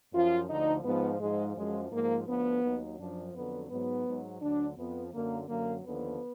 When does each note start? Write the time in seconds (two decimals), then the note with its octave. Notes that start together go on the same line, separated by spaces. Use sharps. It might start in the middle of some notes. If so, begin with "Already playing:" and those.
0.13 F#2 F3 F4
0.49 D2 D3 F3 D#4
0.84 G#2 F3 B3
1.20 G#2 F3 G#3
1.56 F#2 F3 G#3
1.91 G#2 F3 A#3
2.27 D2 D3 F3 B3
2.63 D#2 D#3 F#3
2.98 F#2 F3 D4
3.34 F2 D3 F#3 B3
3.70 G#2 F#3 B3
4.06 G#2 F#3
4.41 D2 D3 F#3 D4
4.77 F2 F3 B3
5.13 F#2 D3 F#3 A#3
5.48 F#2 D3 F#3 A#3
5.84 D#2 D3 F3 B3